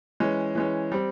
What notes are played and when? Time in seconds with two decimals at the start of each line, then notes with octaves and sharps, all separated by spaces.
0.20 E3 G#3 C#4
0.55 E3 G#3 C#4
0.92 G3 C4